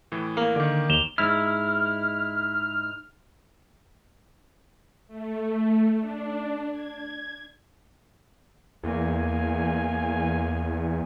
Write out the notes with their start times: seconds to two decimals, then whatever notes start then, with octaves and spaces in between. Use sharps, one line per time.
0.12 A2 E3
0.37 A#3
0.56 D3 D#3 D6
0.90 D#2 E7 F7 G7
1.18 G#2 E4 F6
5.07 A3
5.99 D4
6.71 G#6
8.84 E2 A#3 G#5